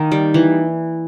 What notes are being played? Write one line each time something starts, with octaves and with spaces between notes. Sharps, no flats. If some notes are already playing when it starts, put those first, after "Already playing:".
Already playing: D#3 A#3 D#4
G3
E3